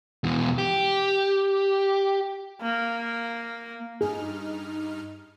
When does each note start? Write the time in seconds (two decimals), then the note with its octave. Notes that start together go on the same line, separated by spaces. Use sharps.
0.24 E2 B2
0.58 G4
2.62 A#3
4.01 G2 D#4 G#4 F6